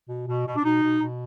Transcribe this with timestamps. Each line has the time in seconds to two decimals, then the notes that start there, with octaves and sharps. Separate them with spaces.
0.08 B2
0.27 B2
0.46 B2
0.56 D4
0.64 B2 D#4
0.83 B2
1.01 B2